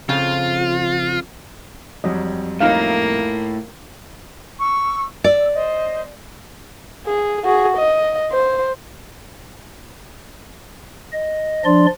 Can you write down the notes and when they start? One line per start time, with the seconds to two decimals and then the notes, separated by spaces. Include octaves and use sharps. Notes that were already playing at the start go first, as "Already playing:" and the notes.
0.09 F2 C#3 F3 F4
2.04 F2 F#3 G3 D#5
2.61 A2 A#3 D#4 F4 F5
4.60 C#6 E6
5.24 D5 E6
5.53 C5 D#5
7.06 G#4
7.44 F#4 G#4
7.77 D#5
8.32 C5
11.13 D#5
11.65 F3 D4 D5 C6